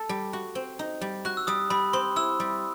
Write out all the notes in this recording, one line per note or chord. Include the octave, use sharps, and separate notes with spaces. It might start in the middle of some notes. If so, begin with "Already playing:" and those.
Already playing: A4
G3
F#4
C4
D#4
G3
F#4 F#6
E6
G3 D#6
G3 B5
C4 C6
E4 E6
G3